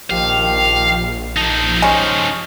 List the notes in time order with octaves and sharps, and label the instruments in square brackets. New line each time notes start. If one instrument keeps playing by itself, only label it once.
[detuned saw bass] A#1 [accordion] D#3 F3 G4 [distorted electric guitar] F5
[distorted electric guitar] F3 D#4 [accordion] A5
[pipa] G3 G#3 C#4 [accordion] C5 C#6 F6